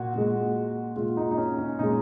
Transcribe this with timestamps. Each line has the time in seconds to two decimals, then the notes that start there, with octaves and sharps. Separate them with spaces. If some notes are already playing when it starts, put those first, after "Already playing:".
Already playing: A#2 F#4
0.14 A#2 G#3
0.96 A#2 G#3 F4
1.17 D#4
1.31 D#4
1.37 C#4
1.58 C#4
1.79 A#2 G#3 D#4